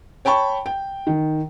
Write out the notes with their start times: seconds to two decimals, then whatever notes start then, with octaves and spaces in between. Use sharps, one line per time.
0.25 C#5 G5 A5 B5 C#6
0.66 G5
1.07 D#3